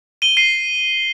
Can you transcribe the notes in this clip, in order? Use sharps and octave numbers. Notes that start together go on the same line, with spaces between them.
D#7 G7
C7 D#7